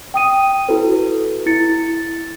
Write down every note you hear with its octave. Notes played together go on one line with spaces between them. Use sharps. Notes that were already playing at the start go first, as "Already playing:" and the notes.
G5 D#6 D#7
E4 F#4 A4 B4
E4 A6 C#7